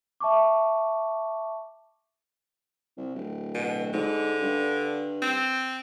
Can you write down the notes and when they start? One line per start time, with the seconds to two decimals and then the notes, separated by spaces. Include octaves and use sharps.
0.20 E5 A5 C#6 D6
2.97 C2
3.15 D1
3.55 B2
3.94 G#2 D3
4.42 G2
5.22 C4